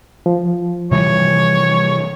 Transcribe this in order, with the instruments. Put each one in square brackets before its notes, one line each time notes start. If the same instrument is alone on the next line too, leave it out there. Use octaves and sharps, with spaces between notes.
[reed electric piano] F3
[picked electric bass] C3 E3 G3 [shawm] C#5